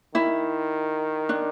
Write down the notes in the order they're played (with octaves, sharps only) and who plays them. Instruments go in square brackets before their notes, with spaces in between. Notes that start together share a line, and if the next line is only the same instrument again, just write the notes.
[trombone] D#3 [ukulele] E4
[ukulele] D4